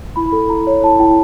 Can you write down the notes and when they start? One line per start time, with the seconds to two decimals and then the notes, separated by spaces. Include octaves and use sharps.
0.16 E4 B5
0.32 A4
0.50 E4 A#5
0.67 C#5
0.84 E4 A5
0.99 E4 G5